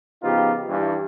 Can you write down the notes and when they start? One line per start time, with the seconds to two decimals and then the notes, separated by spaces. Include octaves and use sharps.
0.23 C#3 F3 B3 D#4 F4 G4
0.68 G2 E3